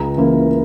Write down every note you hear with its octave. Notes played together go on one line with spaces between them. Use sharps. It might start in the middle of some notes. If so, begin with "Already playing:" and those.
Already playing: C#2 A#5
C#3 E3 A#3